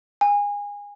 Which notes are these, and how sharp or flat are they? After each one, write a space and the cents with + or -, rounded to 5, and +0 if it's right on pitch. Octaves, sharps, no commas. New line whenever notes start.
G#5 -25